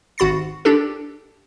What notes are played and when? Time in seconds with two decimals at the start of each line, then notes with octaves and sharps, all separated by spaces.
0.18 G#1 F#4 B5 A6 C7
0.65 D4 G4 A4